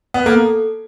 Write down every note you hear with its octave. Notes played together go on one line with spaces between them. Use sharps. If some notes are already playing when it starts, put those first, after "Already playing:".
B3
A#3 A4